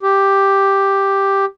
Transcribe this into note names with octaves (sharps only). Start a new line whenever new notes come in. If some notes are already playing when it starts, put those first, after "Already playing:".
G4